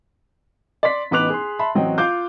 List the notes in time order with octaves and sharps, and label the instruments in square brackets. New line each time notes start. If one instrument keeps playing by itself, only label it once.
[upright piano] D5 C6 B6
A1 B3 D#4 D6 F#6 F7
G#4 C6
E5 A5 B5 C6
A1 F#3 C4 D#5 G5
F4 F5 D6 G6